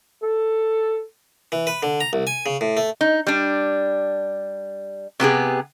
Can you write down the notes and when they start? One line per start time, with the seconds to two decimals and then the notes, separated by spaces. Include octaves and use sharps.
0.23 A4
1.52 E3
1.67 B4
1.83 D3
2.01 A#5
2.13 C2
2.27 G#5
2.46 C#3
2.61 A2
2.77 A3
3.01 D#4
3.27 G3 D4
5.20 C3 B3 G4 G#4